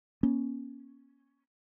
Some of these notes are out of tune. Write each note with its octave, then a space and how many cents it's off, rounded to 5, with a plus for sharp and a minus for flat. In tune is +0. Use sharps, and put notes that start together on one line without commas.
A#3 +45 C#4 +0